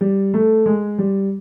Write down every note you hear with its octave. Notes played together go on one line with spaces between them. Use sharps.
G3
A3
G#3
G3